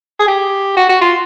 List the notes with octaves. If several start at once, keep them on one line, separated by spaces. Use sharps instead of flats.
G#4
G4
F#4
F#4
F4